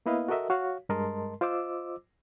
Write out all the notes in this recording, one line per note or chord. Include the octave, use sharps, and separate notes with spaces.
A#3 B3 E4 B4 D#5 F5
F#4 A4 A#4 D#5 E5
F#4 C#5 F5
G2 G#3 A#4 D#5 A5 C6
F4 C5 D#5 D6 E6